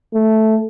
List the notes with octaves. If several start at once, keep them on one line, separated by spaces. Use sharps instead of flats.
A3